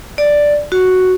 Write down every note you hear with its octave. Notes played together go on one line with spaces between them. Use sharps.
D5
F#4